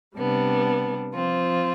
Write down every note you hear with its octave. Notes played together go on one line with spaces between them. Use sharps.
C3 G3 B3 D4
F3 C4 F4